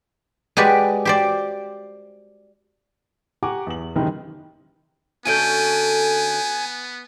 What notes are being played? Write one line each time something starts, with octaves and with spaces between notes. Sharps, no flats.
G#3 F#4 G4 B4 D5
G4 C5 D5
G4 F#5 G#5 A#5 C#6 D6
E2 F#7
F#1 C3 D#3 E3 D#4 G5
D2 B3 C#4 A4 G#5 G6 D7 D#7